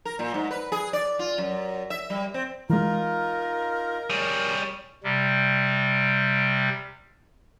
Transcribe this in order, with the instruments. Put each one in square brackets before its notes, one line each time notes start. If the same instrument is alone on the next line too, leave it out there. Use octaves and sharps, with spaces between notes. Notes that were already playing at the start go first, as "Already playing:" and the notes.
[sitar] A#4
A#2
G#2
B4
G#4
D5
F4
F#2
E5
G3
C4
[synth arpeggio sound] E3 G#3 [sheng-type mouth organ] D#4 F4 [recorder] A#4
[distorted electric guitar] G3 G#4 [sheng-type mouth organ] C#5
[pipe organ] C3 G3